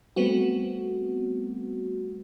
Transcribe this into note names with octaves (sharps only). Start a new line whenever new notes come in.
G3 A3 B3 C4 F#4